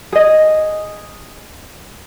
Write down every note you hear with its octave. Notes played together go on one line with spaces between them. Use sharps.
G#4 D#5